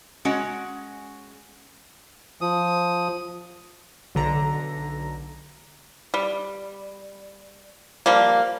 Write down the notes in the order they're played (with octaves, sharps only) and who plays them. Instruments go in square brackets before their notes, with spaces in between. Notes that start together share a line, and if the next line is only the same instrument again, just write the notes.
[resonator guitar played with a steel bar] G#3 C#4 F#4 F#5
[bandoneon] F3 D#6
[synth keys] B1 D3 A#5 A#6
[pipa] G3
F3 G3 A#3